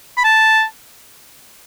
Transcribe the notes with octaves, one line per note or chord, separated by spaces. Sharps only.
B5
A5